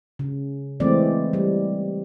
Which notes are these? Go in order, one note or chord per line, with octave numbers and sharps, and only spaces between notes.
C#3
E3 G#3 A3 C4 D5
G3